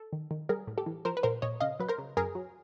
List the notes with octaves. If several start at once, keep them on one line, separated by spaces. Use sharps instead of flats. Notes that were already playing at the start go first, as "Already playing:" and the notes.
Already playing: A4
D#3
D#3
G3 G#4 A#4
A2
G4 A4
E3
F3 A#4 C5
B4
A#2 A#4 C5
A#2 C#5 D#5
C#3 D#5 F5
F#3 B4
A#4 C5
C#3
F#2 G#4 A#4
F#3